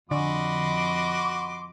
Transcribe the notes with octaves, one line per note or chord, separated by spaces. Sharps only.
F2 D3 F#4 D#5 B5 C6 D6